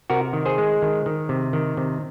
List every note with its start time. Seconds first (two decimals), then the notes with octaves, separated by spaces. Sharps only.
0.10 C3 F#4 A#4
0.33 D#3
0.45 G#4 C5
0.58 G#3
0.82 D#3
1.06 D#3
1.29 C3
1.53 D#3
1.77 C3